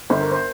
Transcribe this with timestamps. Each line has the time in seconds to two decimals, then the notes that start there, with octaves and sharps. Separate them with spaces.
0.10 G1 C5
0.21 A#4
0.32 C5